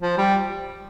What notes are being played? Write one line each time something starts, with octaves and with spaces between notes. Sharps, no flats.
F3
G3